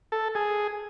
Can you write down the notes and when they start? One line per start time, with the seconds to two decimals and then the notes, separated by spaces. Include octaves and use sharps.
0.12 A4
0.35 G#4